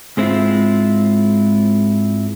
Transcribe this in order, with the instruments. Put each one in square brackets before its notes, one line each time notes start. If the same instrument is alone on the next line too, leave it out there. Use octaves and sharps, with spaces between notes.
[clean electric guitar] G#2 G#3 C4 E4 F4